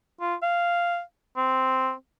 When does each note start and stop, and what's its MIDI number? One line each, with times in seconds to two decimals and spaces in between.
0.21 0.35 65
0.43 1.00 77
1.37 1.92 60